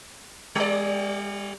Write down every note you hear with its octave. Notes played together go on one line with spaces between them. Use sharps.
G3 D5